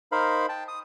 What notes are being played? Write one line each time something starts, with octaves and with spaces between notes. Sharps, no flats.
D#4 A#4 C5 F5 B5
G5 A5
D#6